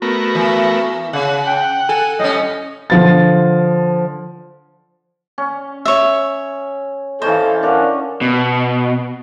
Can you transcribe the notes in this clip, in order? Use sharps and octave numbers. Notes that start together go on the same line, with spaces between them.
A3 B3 F#4 A#4
E3
C#3 F#5
G5
A4 G#5
A2 G3 C#4 D#5
D3 F3 A6
C#4
C#5 E5
E3 C#4 A4 C5 D#5 F5
C#4 D4 A#4 F5 F#5
B2